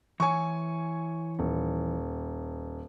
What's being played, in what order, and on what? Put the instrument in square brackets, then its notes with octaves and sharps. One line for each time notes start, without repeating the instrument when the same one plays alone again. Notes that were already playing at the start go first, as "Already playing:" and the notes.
[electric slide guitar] E3 C#5 [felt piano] G#5 C#6
[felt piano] D#1